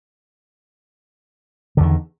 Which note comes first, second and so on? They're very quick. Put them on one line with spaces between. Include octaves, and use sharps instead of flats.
D3 E2 D#3